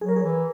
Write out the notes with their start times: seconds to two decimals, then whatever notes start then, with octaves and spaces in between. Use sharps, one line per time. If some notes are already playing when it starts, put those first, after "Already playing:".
0.01 F#3 G#4
0.09 A#4
0.16 G#4
0.23 E3